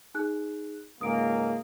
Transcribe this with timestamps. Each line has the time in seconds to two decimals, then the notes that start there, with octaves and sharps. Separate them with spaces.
0.15 D#4 G#4 F#6
1.01 C#2 G#2 A#3 D#6 D7